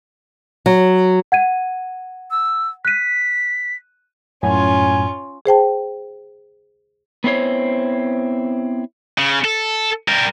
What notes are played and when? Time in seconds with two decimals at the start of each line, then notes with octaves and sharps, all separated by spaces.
0.66 F#3
1.32 F#5 G#6 D#7
2.30 E6
2.85 F#6 B6 D#7
4.43 F#2 A2 C#4 F4 G#5
5.46 G#4 C5 G5 A5
7.24 B3 C4 E4 C5 C#5
9.18 C#3
9.45 A4
10.08 G3 A#4